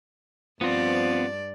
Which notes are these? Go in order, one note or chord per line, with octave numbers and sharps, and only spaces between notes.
G2 F3 B3 C4 D5